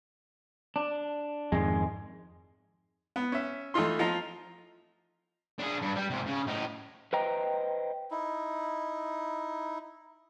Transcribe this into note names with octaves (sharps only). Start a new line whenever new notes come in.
D4
F2 G#2 D#3 G#3
B3
C#4 E5
E3 A3 D#4 F4 C6
F3 F4 D#5 F5 A#5
D4 G#4
G2
G3
G#2 C3
C#3
A2 D#4
B4 C5 D#5 G5 A#5
D#4 E4